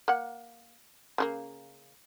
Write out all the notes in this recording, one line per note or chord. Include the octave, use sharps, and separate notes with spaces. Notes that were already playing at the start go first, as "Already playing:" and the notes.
A#3 F#5
C#3 G3 A#3